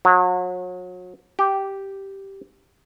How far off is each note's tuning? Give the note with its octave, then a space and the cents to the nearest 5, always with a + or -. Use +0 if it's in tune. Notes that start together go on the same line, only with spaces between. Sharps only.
F#3 -35
G4 -5